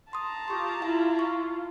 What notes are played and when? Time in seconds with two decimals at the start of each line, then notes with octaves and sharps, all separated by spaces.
0.13 A5 A#5 C6 D#6
0.48 F4 G4 C6 C#6
0.82 E4 F4 F5
1.19 C#6